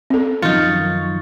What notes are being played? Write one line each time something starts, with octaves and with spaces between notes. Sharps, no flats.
C4 A4
F#2 D#3 F3 F#3 D#4 F4 C#6 A6